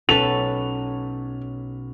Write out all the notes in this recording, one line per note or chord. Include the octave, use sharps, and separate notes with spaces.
B1 C#4 A4 B4 A6 F7